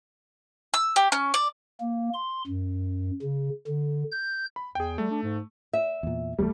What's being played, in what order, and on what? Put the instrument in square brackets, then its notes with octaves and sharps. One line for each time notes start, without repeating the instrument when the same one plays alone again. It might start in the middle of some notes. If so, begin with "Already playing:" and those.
[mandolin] E6
G4
C#4
D5
[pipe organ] A#3
C6
F#2
C#3
D3
G6
[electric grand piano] B5
[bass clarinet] E2 [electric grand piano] G#4 G5
[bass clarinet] G3 [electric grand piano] A3
[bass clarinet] D4
G#2
[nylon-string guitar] E5
[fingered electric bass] E2 A#2
[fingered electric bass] F1 E2 [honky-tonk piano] G3 A3